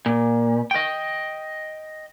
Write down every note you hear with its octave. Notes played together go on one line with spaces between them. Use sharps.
A#2
D#5 G5